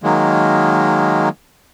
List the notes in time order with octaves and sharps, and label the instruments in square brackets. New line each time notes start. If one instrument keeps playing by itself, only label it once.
[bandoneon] D#3 F#3 G#3 A#3